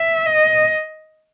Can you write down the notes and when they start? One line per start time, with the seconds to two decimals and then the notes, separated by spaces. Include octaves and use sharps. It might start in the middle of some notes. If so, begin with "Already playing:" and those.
Already playing: E5
0.26 D#5